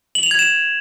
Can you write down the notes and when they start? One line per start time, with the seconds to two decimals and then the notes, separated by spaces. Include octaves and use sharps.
0.15 F#7
0.23 F7
0.31 G#6
0.39 E7